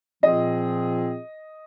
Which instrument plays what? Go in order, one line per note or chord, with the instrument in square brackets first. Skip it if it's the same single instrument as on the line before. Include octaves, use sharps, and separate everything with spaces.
[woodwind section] A#2 F3 C4 F4 G#4 [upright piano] D#5